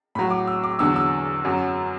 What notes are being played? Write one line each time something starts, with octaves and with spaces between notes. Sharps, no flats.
A2 F#3 B5
D6
E6
D6
E2 D3 F#3 E6
E6
F#2 F#3